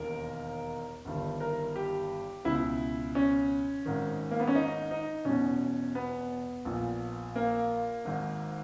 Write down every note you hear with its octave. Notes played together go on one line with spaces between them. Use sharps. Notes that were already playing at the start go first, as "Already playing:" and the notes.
Already playing: E1 D#2 D#3 A#4
G1 G2 D#3
A#4
G4
C#2 B2 E4
C#4
G#1 G#2 D#3
A#3
B3
C#4
D#4
D#4
E1 E2 B2 C#4
B3
A#1 A#2
A#3
G#1 G#2 D#3